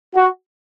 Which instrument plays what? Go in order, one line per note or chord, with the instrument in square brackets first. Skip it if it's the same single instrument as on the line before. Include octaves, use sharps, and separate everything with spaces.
[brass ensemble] F#4